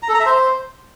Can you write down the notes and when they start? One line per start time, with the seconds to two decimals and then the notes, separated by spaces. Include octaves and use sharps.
0.03 A#5
0.08 A4
0.14 A#5
0.20 E5
0.26 C5